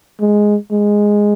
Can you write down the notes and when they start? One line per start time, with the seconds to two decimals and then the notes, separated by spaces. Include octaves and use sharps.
0.21 G#3
0.71 G#3